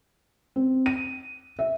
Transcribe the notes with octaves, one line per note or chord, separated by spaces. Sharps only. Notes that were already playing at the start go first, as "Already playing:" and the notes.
C4
D#7
E5